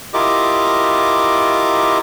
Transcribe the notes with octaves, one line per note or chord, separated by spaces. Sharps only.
E4 F4 G4 A#4 D#5 D6